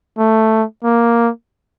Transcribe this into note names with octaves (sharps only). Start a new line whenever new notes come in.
A3
A#3